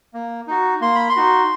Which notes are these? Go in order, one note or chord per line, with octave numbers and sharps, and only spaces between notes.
A#3
D#4 F#4
A#3 C6
B5
C6
D#4 F#4